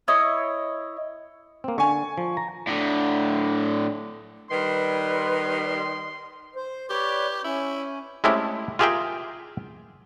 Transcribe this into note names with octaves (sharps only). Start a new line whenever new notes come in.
E4 C#5 D#5
A#3 C4
D3 G#5 C#6
F3
A#5
A2 D3
D#3 G3 B4 C6
C5
G4 B4 C#5 D5
C#4 E4
G#3 A3 C4 C#4 E4 G4
F4 G4 G#4 A#4 E5 G5